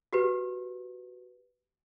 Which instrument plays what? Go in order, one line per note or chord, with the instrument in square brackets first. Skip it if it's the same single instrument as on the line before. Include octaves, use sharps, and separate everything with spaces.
[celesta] F#4 G4 B4